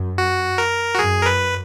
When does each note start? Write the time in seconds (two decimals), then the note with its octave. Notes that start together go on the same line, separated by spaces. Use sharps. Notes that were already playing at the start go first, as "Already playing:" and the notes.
Already playing: F#2
0.18 F#4
0.58 A#4
0.95 F#4
0.99 F#2 G#4
1.21 A#4
1.26 B4